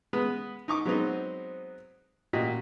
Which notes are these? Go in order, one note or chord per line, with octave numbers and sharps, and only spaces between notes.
G#3 B3 B4 D#6
D#4 C#6 D6
F#3 G#3 B3 C4 D#4 C5
A#2 F#4 G4 D#5